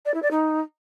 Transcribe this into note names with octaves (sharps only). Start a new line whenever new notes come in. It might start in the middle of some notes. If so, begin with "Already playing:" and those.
D5
E4
D5
D#4